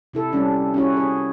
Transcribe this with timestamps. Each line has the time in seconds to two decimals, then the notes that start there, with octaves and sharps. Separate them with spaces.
0.13 C3 E4 A4
0.33 G3 C#4 D4
0.74 C#4 E4 F#4
0.97 G#4